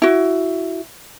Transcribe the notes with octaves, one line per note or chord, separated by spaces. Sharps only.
E4 F#4